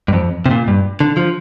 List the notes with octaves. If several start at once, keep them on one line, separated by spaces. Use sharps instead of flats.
G2
F2
C3
A#2
G2
D3
F3